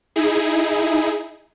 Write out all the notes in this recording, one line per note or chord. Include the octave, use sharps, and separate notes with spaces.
D#4 E4 G#4